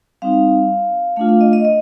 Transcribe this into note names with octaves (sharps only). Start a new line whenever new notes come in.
G3 C4 D#4 F5
A3 D4 F4 F5
F5
D#5
D#5
D#5